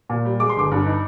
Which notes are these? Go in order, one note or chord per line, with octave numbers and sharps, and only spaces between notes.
A#2
G3
G#3 D6
C6
G1 D6
G2
D#4